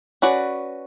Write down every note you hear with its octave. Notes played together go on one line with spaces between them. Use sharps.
C#4 F#4 B4 D5